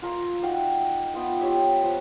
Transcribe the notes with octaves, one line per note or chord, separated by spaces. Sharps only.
F4 A#4 F5
D#4 F#4 F5 G5
B3 F4 G5
F4 G4 C#5 E5
F3 B4